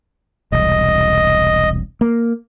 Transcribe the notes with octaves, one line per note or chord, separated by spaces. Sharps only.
E1 C2 D#5
A#3